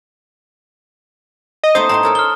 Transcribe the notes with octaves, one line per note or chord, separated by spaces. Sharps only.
D#5
A3 B3 D#4 C5 D#6
A2 D#4 A#5 C6
A4 A#4 C#5
A4 F6 G7